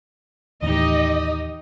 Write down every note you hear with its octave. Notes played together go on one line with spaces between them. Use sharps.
D#2 A2 E3 D#4 G4 D#5